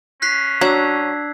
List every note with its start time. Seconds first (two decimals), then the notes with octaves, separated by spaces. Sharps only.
0.22 C#4 F#6 B6 C7
0.61 F#3 D4 E6 G#6